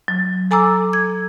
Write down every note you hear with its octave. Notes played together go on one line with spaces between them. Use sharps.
F#3
A4 G#5 A#5 D6 E6
G#6